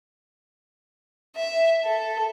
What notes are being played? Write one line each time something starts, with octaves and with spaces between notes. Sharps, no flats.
E5
A4